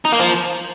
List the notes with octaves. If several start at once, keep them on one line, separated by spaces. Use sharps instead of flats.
D#4
A#3
F3